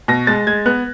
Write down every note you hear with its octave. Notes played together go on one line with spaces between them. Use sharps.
B2 A#6
G#3 A6
G#3 G#6
B3 F#6